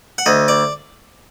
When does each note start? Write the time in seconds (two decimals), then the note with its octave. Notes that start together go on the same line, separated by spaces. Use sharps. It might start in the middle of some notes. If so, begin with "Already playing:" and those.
0.18 F#5
0.26 D2 D#5
0.48 D5